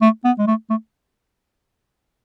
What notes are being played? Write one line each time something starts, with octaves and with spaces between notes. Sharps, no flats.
A3
B3
G#3
A3
A3